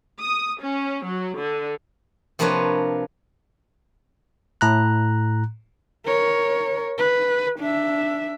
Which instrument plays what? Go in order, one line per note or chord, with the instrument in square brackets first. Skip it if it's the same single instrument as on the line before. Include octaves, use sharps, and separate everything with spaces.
[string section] D#6
C#4
F#3
D3
[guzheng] C3 F3 A#3 D4 B4 C#5
[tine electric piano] A2 A#5 F#6
[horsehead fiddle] A#4 C#5
B4
D4 E5